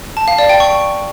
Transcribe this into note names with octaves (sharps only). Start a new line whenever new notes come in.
A5
F5
D5
G5
C#6